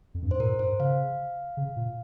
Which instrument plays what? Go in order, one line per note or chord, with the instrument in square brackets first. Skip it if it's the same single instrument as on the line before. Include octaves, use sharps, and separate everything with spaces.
[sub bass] F2
G2
[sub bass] G#2 [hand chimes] C5
[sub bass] A#2 [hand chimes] A#4
[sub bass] G#2 [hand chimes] C5
[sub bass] C#3 [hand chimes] F5
[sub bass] C#3
A#2